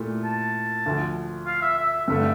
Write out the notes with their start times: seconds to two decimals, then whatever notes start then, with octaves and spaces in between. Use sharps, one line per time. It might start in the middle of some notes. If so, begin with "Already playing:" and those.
Already playing: A#2 A3 E4 G4
0.24 A5
0.86 D2 D3 F3
1.47 F5
1.62 E5
1.77 E5
1.93 E5
2.08 G2 D3 A3 E5